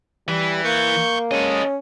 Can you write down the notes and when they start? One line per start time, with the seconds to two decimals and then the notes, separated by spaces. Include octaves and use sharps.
0.28 E3 G3
0.64 A#3 C#6 G6
1.31 G#3 C#4 A4 D#5